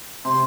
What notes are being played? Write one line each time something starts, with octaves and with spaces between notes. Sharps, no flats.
C3 C6